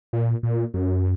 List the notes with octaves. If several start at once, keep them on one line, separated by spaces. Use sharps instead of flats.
A#2
A#2
F#2